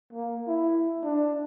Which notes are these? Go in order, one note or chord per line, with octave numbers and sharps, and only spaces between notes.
A#3
E4
D4